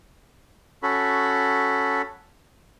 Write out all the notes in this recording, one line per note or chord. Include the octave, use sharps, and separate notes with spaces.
C#4 F#4 A4 B5